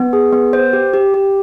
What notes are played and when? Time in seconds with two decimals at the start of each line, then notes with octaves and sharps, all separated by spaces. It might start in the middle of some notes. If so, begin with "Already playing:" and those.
Already playing: B3
0.13 G#4
0.33 B3
0.53 C5
0.73 G4
0.94 G4
1.14 G4